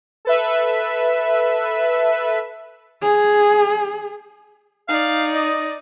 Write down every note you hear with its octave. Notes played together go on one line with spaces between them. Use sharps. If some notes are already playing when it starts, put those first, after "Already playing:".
A4 B4 E5
G#4
D#4 D5 F5
D#5